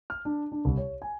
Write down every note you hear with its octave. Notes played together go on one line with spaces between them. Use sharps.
F6
D4
D4
C2
C#5
G#5